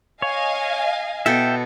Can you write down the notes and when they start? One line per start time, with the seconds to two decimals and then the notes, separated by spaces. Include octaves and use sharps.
0.22 C#5 D#5 F5 G#5
1.26 B2 A4 E5 G5